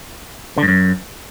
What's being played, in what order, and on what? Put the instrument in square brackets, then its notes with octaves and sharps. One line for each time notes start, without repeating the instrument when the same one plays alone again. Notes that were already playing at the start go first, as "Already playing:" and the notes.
[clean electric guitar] D3
G2
F#2